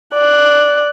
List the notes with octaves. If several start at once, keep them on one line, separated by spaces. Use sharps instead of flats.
D5 F#6